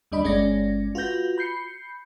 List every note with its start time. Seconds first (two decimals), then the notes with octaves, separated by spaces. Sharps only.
0.12 D#2 G3 D4 D#5 B5
0.24 G1 G#3 C#4 D5 A#6
0.95 F4 F#4 B4 G6 A#6
1.38 B5 G6 C7 C#7